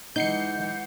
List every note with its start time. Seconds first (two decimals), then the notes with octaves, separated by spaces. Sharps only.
0.16 E3 G#3 D#4 F#5 G6 C7 C#7